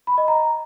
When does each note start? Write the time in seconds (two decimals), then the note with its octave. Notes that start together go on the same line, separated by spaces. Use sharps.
0.07 B5
0.18 D#5
0.28 A#5